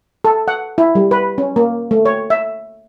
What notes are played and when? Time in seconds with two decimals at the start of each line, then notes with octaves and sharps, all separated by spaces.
0.24 A4
0.48 F#5
0.78 E4
0.95 G3
1.11 B4
1.38 C#4
1.56 A#3
1.91 A3
2.05 C#5
2.30 E5